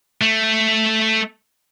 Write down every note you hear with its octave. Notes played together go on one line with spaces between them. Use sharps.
A3